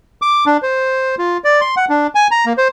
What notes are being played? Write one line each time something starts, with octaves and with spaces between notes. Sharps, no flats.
D6
D4
C5
F4
D5
C6
F#5
D4
G#5
A#5
A#3
C5